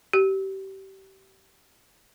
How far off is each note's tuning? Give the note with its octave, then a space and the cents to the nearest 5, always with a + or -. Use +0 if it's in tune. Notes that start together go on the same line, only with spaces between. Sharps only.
G4 -30